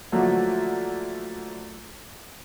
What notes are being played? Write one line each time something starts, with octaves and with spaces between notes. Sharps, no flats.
D3 F3 F#3 A3 A#3